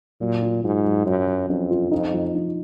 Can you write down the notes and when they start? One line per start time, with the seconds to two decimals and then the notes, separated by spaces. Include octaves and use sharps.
0.20 A#2 F#3
0.42 F4
0.63 G#2 F#3
0.85 F#3
1.06 F#2 F#3
1.27 F#3
1.49 F2 C#4
1.71 F4
1.92 F2 D#4
2.13 F3
2.35 D#4